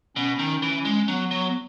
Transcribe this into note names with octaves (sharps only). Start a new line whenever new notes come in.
B2 C#4
D#3
E3
G#3
F#3 B3
F#3